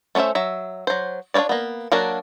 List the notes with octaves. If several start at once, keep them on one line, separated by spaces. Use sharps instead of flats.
A3 C#4 G#4 C5 E5
F#3 E5
F#3 C5
D4 F4 B4 C#5 D5
A#3 B3
F#3 A#3 D4 F#4 A#4